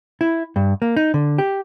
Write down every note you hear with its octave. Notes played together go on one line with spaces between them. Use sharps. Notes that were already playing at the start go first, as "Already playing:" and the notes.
E4
G2
A#3
D#4
D3
G4